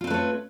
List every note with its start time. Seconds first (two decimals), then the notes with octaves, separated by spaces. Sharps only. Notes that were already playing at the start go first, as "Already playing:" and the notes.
0.01 F4
0.04 C4
0.07 B4
0.10 A3
0.14 C#5